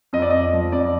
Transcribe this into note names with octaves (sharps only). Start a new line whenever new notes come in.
F2 D#5
D5
F2 D#5
F3
F2 D5